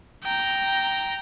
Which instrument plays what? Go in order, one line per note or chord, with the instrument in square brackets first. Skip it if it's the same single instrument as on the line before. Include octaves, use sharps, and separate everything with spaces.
[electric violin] G5 A#5